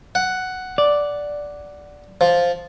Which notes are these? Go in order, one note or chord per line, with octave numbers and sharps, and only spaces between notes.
F#5
D5
F3